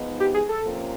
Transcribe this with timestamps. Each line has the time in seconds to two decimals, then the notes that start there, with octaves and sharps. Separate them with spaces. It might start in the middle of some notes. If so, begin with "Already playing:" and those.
Already playing: F3 G#3 B3 D#4
0.20 G4
0.34 G#4
0.49 A4
0.63 C3 F3 A#3 C#4 F4